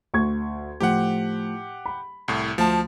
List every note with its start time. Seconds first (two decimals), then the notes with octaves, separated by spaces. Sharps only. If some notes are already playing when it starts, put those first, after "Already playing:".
0.14 D2 C#6 G#6
0.80 A2 F3 G4 F#5
1.86 B5
2.28 C2 A2
2.58 D2 F3 A5